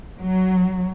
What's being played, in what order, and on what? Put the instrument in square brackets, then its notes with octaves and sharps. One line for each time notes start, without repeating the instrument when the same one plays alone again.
[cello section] F#3